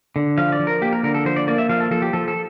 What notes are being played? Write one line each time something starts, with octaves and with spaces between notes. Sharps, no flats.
D3
F3 F5
D5
F3
A#4
A#3 G4
A#4
D3 A#4
A4
F3 C5
D5
A#3 D5
E5
F3 F5
A4
F3 A4
G4
F3 A4
A4